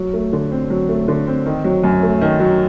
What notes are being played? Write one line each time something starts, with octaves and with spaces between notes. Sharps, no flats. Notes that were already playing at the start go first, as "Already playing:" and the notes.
Already playing: F#3
A3
D3
C4
F#3
A3
D3
C4
D#3
F#3
F#2
A3
D#3
F#3